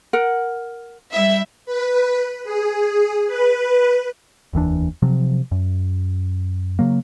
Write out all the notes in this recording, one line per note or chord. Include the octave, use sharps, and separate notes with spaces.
A#4 F#5
G3 E4 E5
B4
G#4
B4
F1 D#2 E3 D4
C3 F3 F#3
F#2
C#3 F#3 A#3